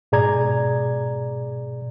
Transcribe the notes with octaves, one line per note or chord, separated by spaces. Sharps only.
G#2 B2 G#4 D5 A#5 G#6